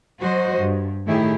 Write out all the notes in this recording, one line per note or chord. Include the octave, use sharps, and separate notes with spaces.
F#3 F#4 C5 D#5
G2
A2 D#3 A3 E4 G4 G#4